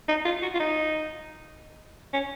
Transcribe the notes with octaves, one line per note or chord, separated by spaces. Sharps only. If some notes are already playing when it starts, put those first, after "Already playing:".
D#4
F4
F#4
F4
D#4
C#4